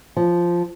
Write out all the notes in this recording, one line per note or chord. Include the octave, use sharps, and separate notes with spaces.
F3